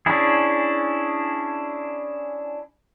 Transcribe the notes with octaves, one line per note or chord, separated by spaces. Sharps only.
C#4 D4 E4 G#4